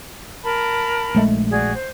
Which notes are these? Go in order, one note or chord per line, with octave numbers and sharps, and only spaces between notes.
A#4 A5 B5
A#1 G#3 A3
F#4 G#4 D5
C5